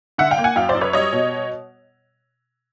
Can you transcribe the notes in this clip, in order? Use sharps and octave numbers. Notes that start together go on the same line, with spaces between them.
D3 E5 F#5
F5 G5
A#3
F#5 G#5
F#2 F5 G5
C5 D5
F#2
B4 C#5
G3 C#5 D#5
B2